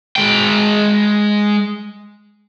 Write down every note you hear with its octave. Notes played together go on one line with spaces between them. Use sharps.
G#3 G5